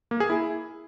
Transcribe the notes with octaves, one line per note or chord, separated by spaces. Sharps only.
A#3
G#4
E4